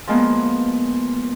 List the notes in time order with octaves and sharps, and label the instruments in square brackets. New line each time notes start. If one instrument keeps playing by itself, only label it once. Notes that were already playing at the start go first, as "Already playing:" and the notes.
[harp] F3 G#3 A#3 B3